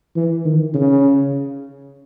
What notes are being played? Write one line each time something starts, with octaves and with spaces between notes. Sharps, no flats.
E3
D#3
C#3